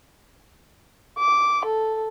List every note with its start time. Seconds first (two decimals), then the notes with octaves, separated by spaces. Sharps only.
1.19 D6
1.65 A4